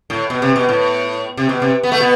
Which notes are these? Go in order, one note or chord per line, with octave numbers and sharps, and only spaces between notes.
A2
B2
C3
B2
A2
C3
B2
C3
B3
A3
B2 B3